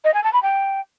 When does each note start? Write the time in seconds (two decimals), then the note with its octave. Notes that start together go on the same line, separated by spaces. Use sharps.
0.05 D#5
0.14 G#5
0.24 A5
0.33 B5
0.43 G5